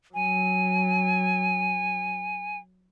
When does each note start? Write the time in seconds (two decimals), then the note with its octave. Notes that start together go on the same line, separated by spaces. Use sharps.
0.14 F#3 G#5